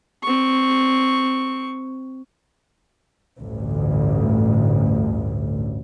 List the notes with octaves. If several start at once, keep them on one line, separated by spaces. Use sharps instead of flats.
C4 C#6
A1 D2 G2